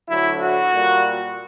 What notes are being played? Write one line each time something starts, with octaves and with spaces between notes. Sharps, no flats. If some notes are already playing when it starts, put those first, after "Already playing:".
D2 D3 F#3 E4
F#4
A#2 G3